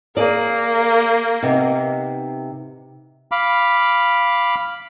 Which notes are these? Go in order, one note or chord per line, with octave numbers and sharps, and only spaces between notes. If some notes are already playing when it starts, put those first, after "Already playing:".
A#3 G#4 D5
C3 B3 D#4
F5 B5 D6